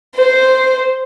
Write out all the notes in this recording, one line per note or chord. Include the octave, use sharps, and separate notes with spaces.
C5